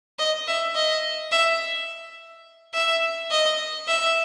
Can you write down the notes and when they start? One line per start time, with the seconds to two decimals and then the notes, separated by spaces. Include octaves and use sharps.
0.19 D#5
0.47 E5
0.75 D#5
1.32 E5
2.74 E5
3.31 D#5
3.88 E5